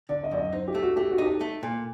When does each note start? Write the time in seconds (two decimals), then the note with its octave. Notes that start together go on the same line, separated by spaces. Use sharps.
0.09 D3 D5
0.23 D#5
0.31 F#2 D5
0.38 D#5
0.52 D#4 C5
0.68 G4
0.75 A3
0.82 F#4
0.96 A3 G4
1.11 F#4
1.18 D#4 G4
1.26 A4
1.41 A3
1.63 A#2